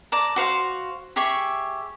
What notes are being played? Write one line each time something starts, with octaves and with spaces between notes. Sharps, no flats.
D5 A5 A#5
F#4 C5 F5
G4 G#4 E5 C#6